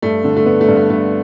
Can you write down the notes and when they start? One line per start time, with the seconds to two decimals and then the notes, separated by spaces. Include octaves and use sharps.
0.02 G2 A3
0.24 D3
0.37 A3
0.46 D3 B3
0.61 A3
0.68 G2
0.76 B3
0.90 D3 A3